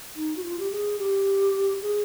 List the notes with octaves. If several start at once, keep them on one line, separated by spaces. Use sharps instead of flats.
D#4
F#4
F4
G4
G#4
G4
G#4